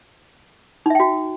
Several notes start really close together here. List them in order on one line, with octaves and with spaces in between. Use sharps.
D#4 E5 G5 F#4